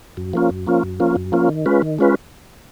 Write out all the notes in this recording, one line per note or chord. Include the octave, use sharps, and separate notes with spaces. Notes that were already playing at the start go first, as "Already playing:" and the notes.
F#2
F3 A#3 C#4 F4
F#2
F3 A#3 C#4 F4
F#2
F3 A#3 C#4 F4
F#2
F3 A#3 C#4 F4
D#3
G#3 C#4 F4 B4
D#3
G#3 C#4 F4 B4